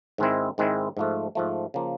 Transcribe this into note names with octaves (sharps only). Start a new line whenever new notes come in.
G#2 D#3 G#3 C4 E4
G#2 D#3 G#3 C4 E4
G#2 F3 A3
G#2 F3 A3
C#3 F3 A#3